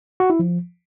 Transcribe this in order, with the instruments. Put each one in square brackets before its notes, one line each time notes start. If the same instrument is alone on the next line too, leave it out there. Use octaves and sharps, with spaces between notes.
[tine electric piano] F#4
E4
F3